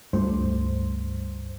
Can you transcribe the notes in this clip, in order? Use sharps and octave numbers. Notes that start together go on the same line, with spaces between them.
C#2 G2 A3 C5